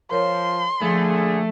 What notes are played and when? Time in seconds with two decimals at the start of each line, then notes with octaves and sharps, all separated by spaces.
0.11 F3 A#4 C#5 C6
0.82 A#1 D3 F3 A3 G#4